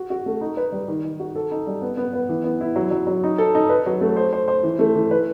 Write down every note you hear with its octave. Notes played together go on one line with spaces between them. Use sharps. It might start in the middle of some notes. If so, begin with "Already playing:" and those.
Already playing: F#4
F#4
A3
D#4
B4
G3
D#3
D#3
F#4
A4
D#4
G3
B3
B3
B3
E3
B3
E4
F#3
F#3
F#3
D#4
A4
D#4
B4
F#3
A3
C5
C5
C5
E3
A3
E3
B4